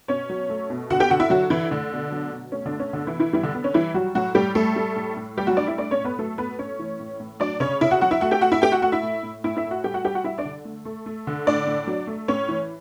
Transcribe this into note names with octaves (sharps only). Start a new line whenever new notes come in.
B2 C#4 C#5
F#3
A3
B2
D3 F#4 F#5
G4 G5
D3 F#4 F#5
E4 E5
D3 F#3 F#4
D3 E3 E4
D3 A3 D4
B2
F#3
B2
A3 C#4
D3 D4
A3
C#4
B2 D3 D4
E3 E4
B2
E3 E4
E3 G3 E4
D3 D4
D3 B3
C#4
E3 G3 E4
F#3 G3 F#4
A2 F#3 F#4
A2 G3 G4
G3 A3 A4
G3
A2
A2
G3 G4
F#3 F#4
A2 D4 D5
E4 E5
A3 D4 D5
C#4 C#5
A2
B3 B4
F#3 A3 A4
A3 B3 B4
A2 C#4 C#5
E3
A2
A2
F#3 D4 D5
C#3 C#4 C#5
C#3 E4 E5
F#4 F#5
F#3 F#4 F#5
E4 E5
A3 F#4 F#5
G4 G5
A3 F#4 F#5
E4 E5
A3 G4 G5
F#4 F#5
A3 F#4 F#5
E4 E5
A2
A2
A2 E4 E5
E4 E5
A3
F#4 F#5
G3 G4 G5
F#4 F#5
G3 G4 G5
F#4 F#5
G3 E4 E5
D4 D5
D3
A3
A3
A3
D3
A2 D4 D5
A2
F#3
A3
A2 C#4 C#5
E3